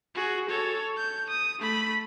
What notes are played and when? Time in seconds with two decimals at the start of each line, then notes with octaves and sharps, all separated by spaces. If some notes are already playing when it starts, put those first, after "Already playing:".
0.15 F#4 G#4
0.49 A4 C#5
0.97 G6
1.29 D#6
1.59 A3 B5